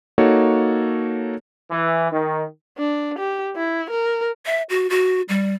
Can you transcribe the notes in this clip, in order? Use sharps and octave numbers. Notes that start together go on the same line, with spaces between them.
A#3 D#4 F#4 A4 C#5
E3
D#3
D4
G4
E4
A#4
E5
F#4
F#4
G3